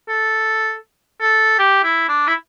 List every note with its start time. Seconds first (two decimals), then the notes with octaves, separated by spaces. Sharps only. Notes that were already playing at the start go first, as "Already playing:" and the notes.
0.08 A4
1.21 A4
1.59 G4
1.84 E4
2.09 D4
2.28 E4